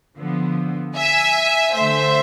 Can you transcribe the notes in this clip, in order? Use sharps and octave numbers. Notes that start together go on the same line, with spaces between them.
D3 F3 B3
E5 G#5
D3 A3 C5 E5